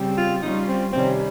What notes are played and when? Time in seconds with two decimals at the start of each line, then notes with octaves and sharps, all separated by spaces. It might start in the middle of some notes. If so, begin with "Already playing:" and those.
Already playing: C#3 G3 C4 G4
0.17 F4
0.42 G3 C#4 D#4 F4
0.68 C4
0.92 C3 D#3 G3 C4 C#4